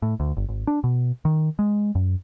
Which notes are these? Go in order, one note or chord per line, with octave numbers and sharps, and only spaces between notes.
A2
D2
G1
G#1
D4
B2
D#3
G#3
F#2